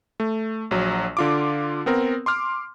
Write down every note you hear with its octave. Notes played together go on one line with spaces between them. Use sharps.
A3
A#1 F#3
D3 F4 D6
B3 C4 A#4
C6 D6 F6